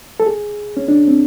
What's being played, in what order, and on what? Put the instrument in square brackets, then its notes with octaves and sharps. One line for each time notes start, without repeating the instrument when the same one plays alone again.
[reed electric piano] A4
G#4
C#4
D4
C4